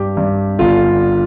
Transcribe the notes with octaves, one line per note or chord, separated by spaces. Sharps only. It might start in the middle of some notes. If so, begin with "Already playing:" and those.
Already playing: G2 G4
G2
G1 F4